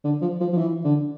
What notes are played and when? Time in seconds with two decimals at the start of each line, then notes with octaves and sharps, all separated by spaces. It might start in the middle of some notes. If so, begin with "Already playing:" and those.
0.04 D3
0.21 F3
0.40 F3
0.53 F3
0.58 E3
0.84 D3